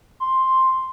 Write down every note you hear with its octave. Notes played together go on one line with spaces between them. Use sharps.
C6